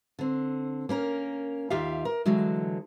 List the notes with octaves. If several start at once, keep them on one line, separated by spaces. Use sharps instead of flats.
D3 C4
A#3 C#4 A#4
D#2 F4 G4 E5 F5
A#4
D3 E3 F#3 G#3